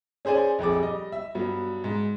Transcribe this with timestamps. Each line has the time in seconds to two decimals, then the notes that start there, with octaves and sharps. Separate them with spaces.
0.25 C#4 G#4 C5 D5 G#5
0.59 A#1 F2 G#4 D6
0.79 G3 D#5
1.12 E5
1.35 G2 F#3 B3
1.84 G#2